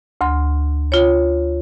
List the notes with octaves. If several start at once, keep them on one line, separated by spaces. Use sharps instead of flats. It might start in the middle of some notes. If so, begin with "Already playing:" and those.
D2 C6
F4 C#5